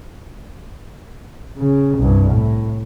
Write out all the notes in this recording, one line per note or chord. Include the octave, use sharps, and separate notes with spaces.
C#3
C2 G2
A2